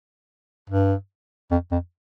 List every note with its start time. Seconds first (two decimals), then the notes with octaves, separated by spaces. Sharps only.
0.70 G2
1.51 F2
1.72 F2